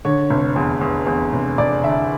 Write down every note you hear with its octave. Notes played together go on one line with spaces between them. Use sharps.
D3 C#5
F1
E2
E2
E2
F1
F1 D5
D3 E5